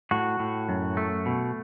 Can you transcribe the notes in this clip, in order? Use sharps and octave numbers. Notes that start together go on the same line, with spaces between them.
A2 F#4
A2
F#2
A3
B2